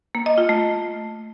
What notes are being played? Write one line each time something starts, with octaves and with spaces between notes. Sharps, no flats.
A#3
D#5
F4
A3